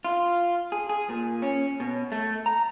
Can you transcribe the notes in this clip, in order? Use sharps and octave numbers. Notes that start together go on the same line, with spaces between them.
F4
G#4
G#4
A#2
C#4
B2
A3
A#5